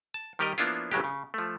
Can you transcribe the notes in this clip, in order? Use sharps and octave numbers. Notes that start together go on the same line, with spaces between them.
A5
D#3 G3 G4 A#4 D#5
F3 A#3 B3 D4 E4 F4
G1 C#3 F#3 G#3 G4
C#3
F3 A3